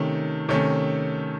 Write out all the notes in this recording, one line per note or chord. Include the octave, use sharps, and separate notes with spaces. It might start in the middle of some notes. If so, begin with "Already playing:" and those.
Already playing: C3 D#3 A3 C#4
C3 D#3 A3 C#4